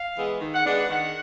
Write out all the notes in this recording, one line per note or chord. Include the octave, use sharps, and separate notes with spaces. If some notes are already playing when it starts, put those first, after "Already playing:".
Already playing: F5
E3 G#3 B3
D#3
F#5
G#3 B3 D4
F#5
D#3 F#5